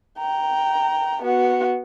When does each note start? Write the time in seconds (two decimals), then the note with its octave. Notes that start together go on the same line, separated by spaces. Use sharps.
0.19 G5 A#5
1.23 B3 F#4